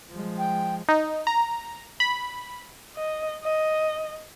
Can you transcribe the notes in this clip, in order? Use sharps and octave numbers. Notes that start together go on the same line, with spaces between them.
F3 G#3
G5
D#4
A#5
B5
D#5
D#5